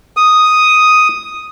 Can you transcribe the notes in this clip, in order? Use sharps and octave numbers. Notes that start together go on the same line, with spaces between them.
D#6